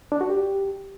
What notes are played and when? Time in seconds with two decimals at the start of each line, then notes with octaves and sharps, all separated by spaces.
0.12 D4
0.21 F#4
0.30 G4